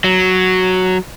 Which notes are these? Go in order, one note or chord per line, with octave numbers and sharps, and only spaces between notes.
F#3